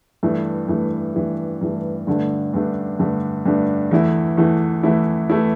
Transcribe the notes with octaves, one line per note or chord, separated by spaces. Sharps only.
G2 E3 A3
G2 E3 A3
G2 E3 A3
G2 E3 A3
G2 D3 A3 D4
G2 D3 A3 D4
G2 D3 A3 D4
G2 D3 A3 D4
E2 E3 A3 E4
E2 E3 A3 E4
E2 E3 A3 E4
E3 A3 E4